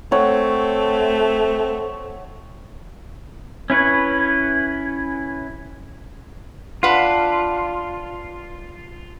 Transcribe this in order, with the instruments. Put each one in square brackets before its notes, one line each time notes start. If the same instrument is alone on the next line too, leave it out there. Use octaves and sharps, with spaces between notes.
[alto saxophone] A3 [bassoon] C4 [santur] C#5 F#5
[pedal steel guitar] C#4 E4 B4 C#5
[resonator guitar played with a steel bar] D4 B4 F#5 [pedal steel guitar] F4